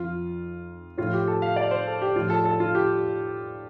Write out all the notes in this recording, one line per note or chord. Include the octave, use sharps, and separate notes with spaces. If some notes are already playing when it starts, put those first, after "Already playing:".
Already playing: F2 F3 F4
A2 F3 F4
G4
A4
F5
D5
C5
A4
G4
A2 F3 F4
A4
A4
F4
G4